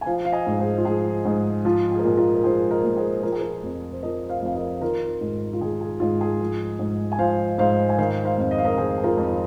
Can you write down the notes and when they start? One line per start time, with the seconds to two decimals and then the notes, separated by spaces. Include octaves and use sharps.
0.01 G#5
0.06 F3 C5 F5
0.25 F5
0.32 D#5 G#5
0.47 G#2
0.60 G#4 C5
0.78 F4
0.85 F3 G#4
1.25 G#2
1.65 F3 F4
1.92 G#4
1.99 A#4
2.05 A#2 G#4
2.17 F4 A#4
2.35 A#4
2.44 F3 G#4 C5
2.71 A#4 D#5
2.84 A#2
2.97 G#4 C5
3.23 F3 A#4
3.32 G#4
3.41 F4 A#4
3.64 F2
3.92 C5
4.02 F3 A#4 D#5
4.29 C5 F5
4.42 F2 F5
4.55 A#4 D#5
4.81 D#3 F4 A#4
5.21 G#2
5.53 F4
5.61 D#3 G#4
5.81 G#4
6.00 G#2 F4
6.21 G#4
6.40 F3
6.79 G#2
7.12 G#5
7.19 F3 C5 F5
7.58 G#2 C5 F5
7.89 G#5
7.98 D#3 C5 F5
8.25 C5 F5
8.38 F2
8.51 D#5
8.58 F5
8.65 A#4 D#5
8.78 D#3 G#4 C5
8.98 G#4
9.03 F4 A#4
9.17 F2